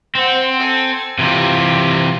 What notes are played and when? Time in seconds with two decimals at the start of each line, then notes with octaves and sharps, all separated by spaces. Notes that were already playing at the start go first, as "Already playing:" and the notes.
0.15 C4 C5 F#5
0.58 A4 G#5
1.19 C3 E3 F4 G4